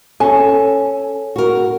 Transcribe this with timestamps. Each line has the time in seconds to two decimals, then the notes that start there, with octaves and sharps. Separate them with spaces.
0.20 C#4 A4 G#5
1.36 F#4 A#4